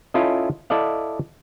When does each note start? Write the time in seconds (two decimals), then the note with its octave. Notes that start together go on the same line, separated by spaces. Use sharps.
0.14 C#4 E4 F4 A4 D#5
0.70 E4 A4 D5 D#5 F5